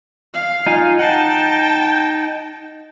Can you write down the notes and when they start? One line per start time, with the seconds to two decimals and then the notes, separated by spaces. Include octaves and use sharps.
0.34 F5
0.67 D#4 F4 G#5
0.99 D#4 F#5 G5 A5